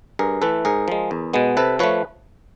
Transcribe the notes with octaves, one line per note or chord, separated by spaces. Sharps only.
G2 G#4 A#4
E3 A3 A4 B4
G#2 G#4 A#4
F3 G#3
E2
B2 G#3 B3
C3 A4 B4
F3 A3 B4 C#5